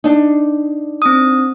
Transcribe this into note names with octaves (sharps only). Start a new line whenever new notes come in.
D4 D#4
C4 D#6